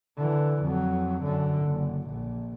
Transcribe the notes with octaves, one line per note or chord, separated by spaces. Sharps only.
D3 E3
F2 F#3
F#2 D3
F#1
A#1